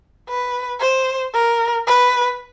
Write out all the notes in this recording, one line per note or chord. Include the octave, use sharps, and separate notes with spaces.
B4
C5
A#4
B4